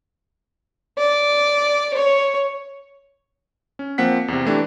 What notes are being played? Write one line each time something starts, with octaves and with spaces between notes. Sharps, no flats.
D5
C#5
C#4
F3 A#3 C4 F#5 B6
E2 C3
E3 A3 D4 G4